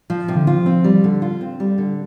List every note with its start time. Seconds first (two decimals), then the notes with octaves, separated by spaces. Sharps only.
0.10 F3
0.28 C3
0.36 D3
0.47 F3 F4
0.66 C4
0.84 G3
1.04 D3
1.22 F4
1.41 C4
1.60 G3
1.78 D3